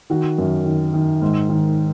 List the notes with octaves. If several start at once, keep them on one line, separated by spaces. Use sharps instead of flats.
D#3 F#4
F#2
D#3
D#3
G#2
D#3